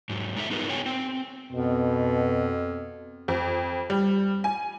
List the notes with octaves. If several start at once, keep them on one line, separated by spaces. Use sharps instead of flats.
G#2 F#3
G#3 D4 D#4 A4 E5
B3 D#4 F4 G#4 A#4 B4
B3 F#4 G#4 C#5 G5 G#5
C4
F2 B2
F2
G3
G#5